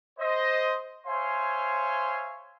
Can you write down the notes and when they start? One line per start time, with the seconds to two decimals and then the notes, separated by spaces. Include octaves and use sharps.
0.19 C5 D#5
1.06 C5 C#5 E5 F5 G#5 C6